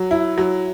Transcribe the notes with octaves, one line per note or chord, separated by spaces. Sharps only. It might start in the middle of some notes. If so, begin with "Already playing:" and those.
Already playing: F#3
E4
F#3